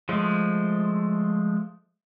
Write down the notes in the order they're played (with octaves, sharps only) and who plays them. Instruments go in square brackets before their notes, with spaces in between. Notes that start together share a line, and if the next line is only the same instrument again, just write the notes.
[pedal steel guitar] F3 G#3 A3